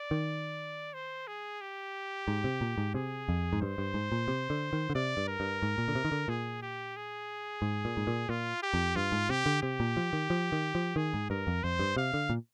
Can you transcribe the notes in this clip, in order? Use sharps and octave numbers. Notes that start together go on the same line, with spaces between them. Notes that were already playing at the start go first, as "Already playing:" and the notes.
Already playing: D5
D#3
C5
G#4
G4
G#2
C3
A#2
G#2
C3 G#4
F2
G#2
G2 C5
G2
G#2
A#2
C3
D3
D#3
D3
C3 D5
G2
A#4
G2
G#2
A#2
D3
C3
D#3
D3
A#2 G#4
G4
G#4
G#2
A#2
G#2
A#2
A#2 F4
G4
F2
G2 F4
G#2
C3 G4
D3
C3 G4
A#2
F3
D#3
F3
D#3
F3
D#3 G#4
G#2
G2 A#4
F2
F2 C5
G2
C3 F5
D3
A#2